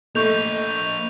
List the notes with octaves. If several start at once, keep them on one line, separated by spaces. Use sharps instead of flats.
A3 A#3 C5 D#5 C#6 G6 F7